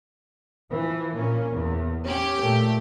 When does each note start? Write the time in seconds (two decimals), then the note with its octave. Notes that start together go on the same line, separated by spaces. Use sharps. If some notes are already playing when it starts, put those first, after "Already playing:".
0.70 E3 F3
1.14 A#2 A#3 C#4
1.52 E2
2.06 C#4 G4
2.41 A#2 A3